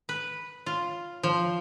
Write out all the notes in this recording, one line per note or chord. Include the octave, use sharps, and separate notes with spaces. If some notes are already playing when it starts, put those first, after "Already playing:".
B4
F4
F3